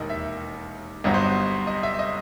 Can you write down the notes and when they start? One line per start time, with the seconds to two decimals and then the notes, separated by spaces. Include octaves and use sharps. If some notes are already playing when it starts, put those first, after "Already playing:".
Already playing: E1 D#2 D#3 D#5
0.10 E5
1.04 G1 G2 F#3 B3 D#5
1.14 C5
1.24 D#5
1.67 D#5
1.83 E5
1.99 D#5